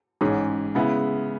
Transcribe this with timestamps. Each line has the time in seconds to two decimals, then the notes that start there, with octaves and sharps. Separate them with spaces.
0.21 A1 G#2 G#3 C#4 G#4
0.75 C#3 G#3 B3 E4